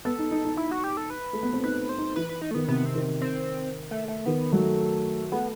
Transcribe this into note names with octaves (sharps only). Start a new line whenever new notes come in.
B3 A4
D#4
D#4
D#4
E4
F#4
G4
A4
B4
A3
B3
C4
D#4 B4
C5
D#4
E3 B4
B4
D#4
A3
D#3 B3
C3 B3
C4
D#3
C4
A3
A3
D#3 B3
F#3 A3
A3 B3